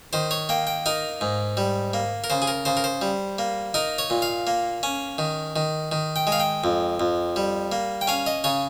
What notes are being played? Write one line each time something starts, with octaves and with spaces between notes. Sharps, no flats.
D#3 C5
C#5
A#3 G5
G5
D#4 A#4
G#2
G3
A#3
A#4
C#3 C5
G#4
A#4
C#3 C5
A#4
C5
G3
A#3
D#4 A#4
C#5
A#2
F5
A#3
C#4
D#3
D#3
D#3
G5
G#3
F5
G5
F2
F2
G3
A#3
G5
C#4 F5
D#5
C#3 C#5